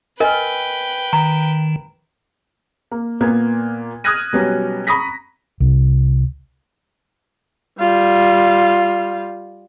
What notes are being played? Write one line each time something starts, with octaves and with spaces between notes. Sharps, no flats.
A#4 B4 D#5 G5 G#5 F6
D#3 A#5
A#3
A#2 A#3 B3 G#6
D#6 F6 F#6 G#6 A#6 D#7
B2 F#3 G3 B3 C#4
A#5 B5 C#6 D#6 A#6 B6
C2
G3 F4